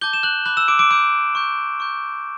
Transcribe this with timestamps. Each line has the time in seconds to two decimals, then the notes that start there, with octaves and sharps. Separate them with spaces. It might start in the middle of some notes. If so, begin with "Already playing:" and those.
0.01 A5 D6 G6 G7
0.13 E7
0.23 F#6 F#7
0.46 B5 D6 F#6 G6 F#7
0.57 E6 E7
0.68 D6 D7
0.79 D6 D7
0.90 B5 D6 E6 G6 D7
1.35 C#6 G6
1.80 C#6 G6